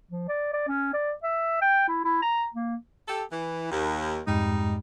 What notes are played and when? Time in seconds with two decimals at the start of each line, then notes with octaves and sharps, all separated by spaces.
0.11 F3
0.28 D5
0.53 D5
0.68 C#4
0.94 D5
1.23 E5
1.62 G5
1.88 E4
2.05 E4
2.22 A#5
2.53 A#3
3.08 G4 A4
3.31 E3
3.71 D#2
4.27 F2 G#2 G3 G#3 D#4